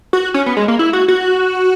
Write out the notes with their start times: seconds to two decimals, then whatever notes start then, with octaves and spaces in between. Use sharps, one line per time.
0.13 F#4
0.34 C#4
0.46 B3
0.57 G#3
0.68 A#3
0.79 E4
0.93 F#4
1.08 F#4